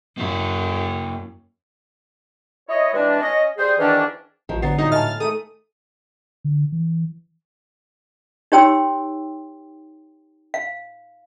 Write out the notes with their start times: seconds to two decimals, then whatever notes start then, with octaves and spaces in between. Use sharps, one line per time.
0.18 F#2 A#3 E4 F5
2.69 E4 C#5 D#5
2.93 E3 G3 G#3 D4
3.22 C#4 D#5
3.58 G3 G#4 C5
3.78 E2 G#2 D#3 E3 C#4 D4
4.49 A1 D#3 F3
4.62 D3 F#3 B3 A6 C7
4.78 G2 A#2 F#3 D#4
4.91 A2 D#5 G#5 A5 F6 A6
5.20 D#3 A3 A4 D#6 D#7
6.44 D3
6.72 E3
8.52 D#4 G4 C#5 G5 C6 E6
10.54 F5